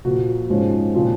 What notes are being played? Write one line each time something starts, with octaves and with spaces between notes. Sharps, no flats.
A#2 F3 A#3 F#4
G#2 F3 G#3 C#4
A#2 F3 C4